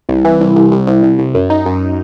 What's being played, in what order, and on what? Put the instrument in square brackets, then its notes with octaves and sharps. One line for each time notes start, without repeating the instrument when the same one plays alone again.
[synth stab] C2
E3
C2
C2
C2
C2
C2
C2
F#2
D#4
F#2